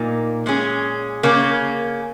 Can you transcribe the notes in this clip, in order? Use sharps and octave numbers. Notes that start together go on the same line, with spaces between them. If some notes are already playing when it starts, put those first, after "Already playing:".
Already playing: A#2 A#3 D#4
A#2 G#3 C#4 G#4
C#3 A#3 C#4